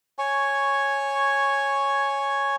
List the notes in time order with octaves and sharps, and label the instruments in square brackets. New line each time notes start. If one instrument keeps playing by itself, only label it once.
[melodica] C#5 G#5 C#6